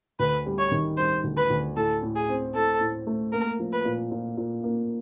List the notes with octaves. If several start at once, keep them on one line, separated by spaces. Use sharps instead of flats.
D2 B4
G3
C#5
D#3
G3 C5
D2
B4
D2
A2 A4
A2
G#4
C4
A2 A4
A2
A3
A#3 A#4
F3
B4
A#2
A#2
A#2
A#3